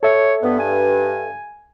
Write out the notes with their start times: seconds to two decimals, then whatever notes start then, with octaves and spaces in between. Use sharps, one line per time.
0.03 A4 C#5 E5
0.42 G2 B3
0.59 G#5